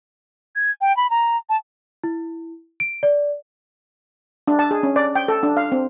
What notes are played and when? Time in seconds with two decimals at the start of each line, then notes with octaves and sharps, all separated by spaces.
0.56 G#6
0.81 G5
0.97 B5
1.10 A#5
1.49 A5
2.04 E4
2.80 D7
3.03 D5
4.48 D4
4.59 A5
4.71 G#4
4.83 C#4
4.96 D5
5.15 G5
5.28 A4
5.43 D4
5.57 F5
5.72 C4